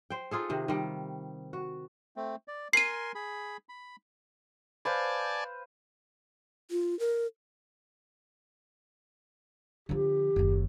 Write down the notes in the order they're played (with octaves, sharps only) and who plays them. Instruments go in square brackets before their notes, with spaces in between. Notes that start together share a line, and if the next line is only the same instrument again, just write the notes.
[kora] C5 G5
D#4 F4 G#4 A4
C3 D#3
D#3 G3
F#4
[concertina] A3 C4
D5
[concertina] A#4 G#5 C6 [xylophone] C7 D#7
[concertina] G#4 B5
B5
[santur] B4 C5 F5 [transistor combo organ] D5 G#5 A5
[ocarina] F4
A#4
[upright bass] D3 F3 [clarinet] G4
[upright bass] F#1 D#2